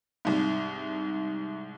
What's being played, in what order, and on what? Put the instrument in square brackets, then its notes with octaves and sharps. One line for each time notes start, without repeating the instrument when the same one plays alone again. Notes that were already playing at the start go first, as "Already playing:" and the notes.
[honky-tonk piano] C2 G#2